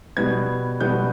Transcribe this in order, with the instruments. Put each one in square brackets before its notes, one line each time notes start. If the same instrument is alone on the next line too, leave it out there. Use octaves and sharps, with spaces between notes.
[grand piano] B2 G3 B3 G#6
B2 G3 B3 G6